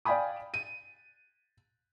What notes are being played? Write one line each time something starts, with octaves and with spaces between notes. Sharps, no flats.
D5 F5 G5 G#5 B5 D#6
D#7